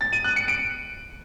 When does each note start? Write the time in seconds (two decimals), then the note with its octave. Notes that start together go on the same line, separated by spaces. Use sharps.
0.01 A6
0.13 D#7
0.24 F#6
0.36 C#7
0.48 D7